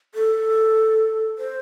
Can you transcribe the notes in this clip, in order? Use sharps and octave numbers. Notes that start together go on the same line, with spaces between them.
A4
C5